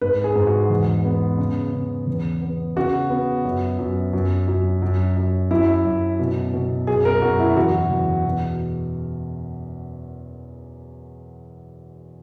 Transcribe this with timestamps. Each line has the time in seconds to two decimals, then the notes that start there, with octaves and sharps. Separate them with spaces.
0.01 G#2 B4
0.24 G#4
0.36 G#2
0.47 F#4
0.70 E2
1.05 B3
1.38 C#3
1.73 C#3
2.07 E2
2.41 B3
2.76 C#3 F#4
3.10 B3
3.45 F#2
3.79 F#2
4.13 F#2
4.47 F#2
4.82 F#2
5.16 F#2
5.51 F#2 E4
5.85 F#2
6.19 B2
6.53 B2
6.87 F#2 G#4
7.05 A#4
7.22 F#2 F#4
7.39 E4
7.57 E2 F#4
7.90 E2
8.25 B2